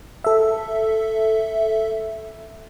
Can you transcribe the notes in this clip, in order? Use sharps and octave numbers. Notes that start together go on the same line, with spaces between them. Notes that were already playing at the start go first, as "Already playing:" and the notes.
A4 E5